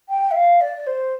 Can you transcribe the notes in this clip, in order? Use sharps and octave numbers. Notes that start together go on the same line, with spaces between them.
G5
E5
F5
D5
C5